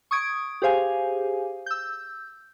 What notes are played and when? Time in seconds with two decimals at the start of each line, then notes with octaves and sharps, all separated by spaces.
0.11 C#6 D#6 G#6 D7
0.62 G4 G#4 C5 F5 G#5
1.66 E6 G6